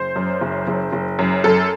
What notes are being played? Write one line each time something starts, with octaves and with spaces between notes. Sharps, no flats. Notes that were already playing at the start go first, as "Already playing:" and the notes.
Already playing: F#1 C5
F#2
F#1
F#1
F#1
F#2
F#2 A4